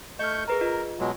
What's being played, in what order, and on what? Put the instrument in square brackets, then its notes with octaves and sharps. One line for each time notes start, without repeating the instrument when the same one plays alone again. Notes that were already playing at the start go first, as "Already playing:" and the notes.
[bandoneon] A3 C#6 G6 [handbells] D#5 F6
[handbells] G#4 B4 A#5 [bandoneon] A#4
[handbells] F4 D#5
[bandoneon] B2 F#3 G#3